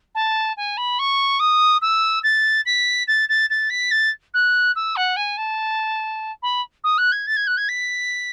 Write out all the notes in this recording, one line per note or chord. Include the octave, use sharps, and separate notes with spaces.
A5
G#5
B5
C#6
D#6
E6
A6
B6
A6
A6
A6
B6
A6
F#6
E6
F#5
G#5
A5
B5
D#6
F#6
G#6
A6
G#6
F#6
G#6
B6